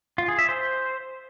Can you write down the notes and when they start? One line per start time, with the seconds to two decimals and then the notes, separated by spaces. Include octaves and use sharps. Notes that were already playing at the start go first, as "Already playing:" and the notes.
0.18 F4
0.28 G#4
0.39 E5
0.49 C5